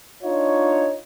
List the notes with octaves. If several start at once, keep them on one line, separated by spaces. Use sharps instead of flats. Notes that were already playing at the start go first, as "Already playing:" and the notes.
D4 D#4 F4 C#5